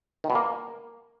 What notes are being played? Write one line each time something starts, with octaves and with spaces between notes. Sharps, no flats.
D#3
B2
A#3